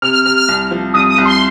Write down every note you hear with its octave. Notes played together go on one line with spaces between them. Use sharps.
C3 F6
F6
C3 F6
F6
C2
F3
C2 D#6
D#6
C2
C6